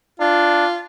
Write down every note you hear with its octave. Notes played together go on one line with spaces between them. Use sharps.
D4 F4